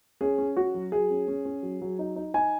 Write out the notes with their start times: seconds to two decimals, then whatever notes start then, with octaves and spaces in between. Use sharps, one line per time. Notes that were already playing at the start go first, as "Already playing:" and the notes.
0.21 C#4 G#4
0.38 C#4
0.57 C#4 F#4
0.75 F#3
0.92 F#3 G#4
1.10 C#4
1.28 C#4
1.45 C#4
1.63 F#3
1.82 F#3
1.99 D#4
2.16 D#4
2.34 D#4 G#5